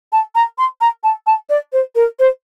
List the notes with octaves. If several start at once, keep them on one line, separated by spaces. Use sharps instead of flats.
A5
A#5
C6
A#5
A5
A5
D5
C5
A#4
C5